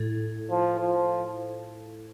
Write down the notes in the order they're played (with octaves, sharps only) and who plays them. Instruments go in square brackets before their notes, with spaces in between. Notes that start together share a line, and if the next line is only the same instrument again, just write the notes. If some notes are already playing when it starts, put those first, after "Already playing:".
Already playing: [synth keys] A2
[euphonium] F3
F3